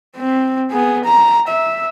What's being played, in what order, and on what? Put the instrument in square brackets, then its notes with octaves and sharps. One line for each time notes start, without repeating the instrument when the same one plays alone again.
[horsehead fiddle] C4
B3 G#4
A#5
E5